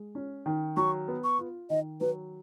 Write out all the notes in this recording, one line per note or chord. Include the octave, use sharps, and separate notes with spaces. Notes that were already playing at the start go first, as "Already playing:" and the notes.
Already playing: G#3
C#4
D#3
F#3 C#6
B3
C#6
F4
D#3 D#5
F#3 B4